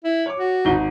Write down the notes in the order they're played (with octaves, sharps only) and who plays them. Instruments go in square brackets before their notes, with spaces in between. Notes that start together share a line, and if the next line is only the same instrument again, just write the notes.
[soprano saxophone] E4
[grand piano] C#5 D6
[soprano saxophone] F#4
[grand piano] G#1 D#4 G7